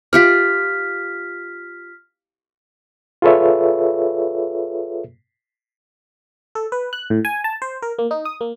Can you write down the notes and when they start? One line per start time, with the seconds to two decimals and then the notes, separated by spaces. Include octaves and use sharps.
0.13 F4 G4 D5 F6 B6
3.22 F4 G#4 A4 B4 C#5 E5
6.55 A4
6.72 B4
6.93 F#6
7.10 A2
7.25 G#5
7.44 A5
7.62 C5
7.82 A#4
7.99 A#3
8.11 D#4
8.25 D#6
8.41 A#3